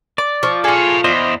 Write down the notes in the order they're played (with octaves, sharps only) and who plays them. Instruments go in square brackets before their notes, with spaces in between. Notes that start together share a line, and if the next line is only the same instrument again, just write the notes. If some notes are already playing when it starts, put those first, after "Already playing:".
[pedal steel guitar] D5 [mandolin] D6
[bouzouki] F3 [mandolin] C#6
[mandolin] F4 G#4 [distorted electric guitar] A4 C#5
[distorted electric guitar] E2 [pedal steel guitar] C5 D#5 [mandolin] D5